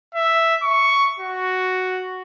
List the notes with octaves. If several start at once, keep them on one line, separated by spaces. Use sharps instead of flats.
E5
C#6
F#4